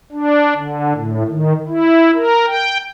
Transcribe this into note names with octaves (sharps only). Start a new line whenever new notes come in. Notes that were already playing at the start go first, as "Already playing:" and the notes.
D4
D3
A2
D#3
E4
A#4
G5